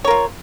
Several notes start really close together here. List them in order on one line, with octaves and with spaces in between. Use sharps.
C#5 A#4 F4